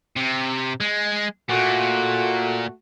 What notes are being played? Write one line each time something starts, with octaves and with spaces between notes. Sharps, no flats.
C3
G#3
A#2 A3 F#4